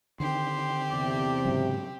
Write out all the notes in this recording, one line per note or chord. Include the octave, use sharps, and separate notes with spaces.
D3 D#3 C4 G4 C6
E2 C3 D5
G#2 C#3 F#3